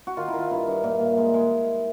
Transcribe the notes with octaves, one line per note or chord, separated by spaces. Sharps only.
F#4
D#3 F4
D#3 E4
F4
G2 E4
G2
A#2
A#2
G#3
G#3